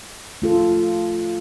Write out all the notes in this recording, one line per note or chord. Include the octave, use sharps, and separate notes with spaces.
A3 F4 A4